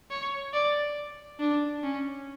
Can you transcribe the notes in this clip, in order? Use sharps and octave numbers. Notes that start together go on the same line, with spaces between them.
C#5
D5
D4
C#4